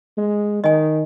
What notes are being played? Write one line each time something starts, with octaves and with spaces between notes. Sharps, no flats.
G#3
D#3 D#5 G#5